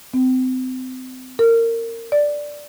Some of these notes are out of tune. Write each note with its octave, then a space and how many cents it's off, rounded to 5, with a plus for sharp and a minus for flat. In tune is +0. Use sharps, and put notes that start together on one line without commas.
C4 -30
A#4 -25
D5 +0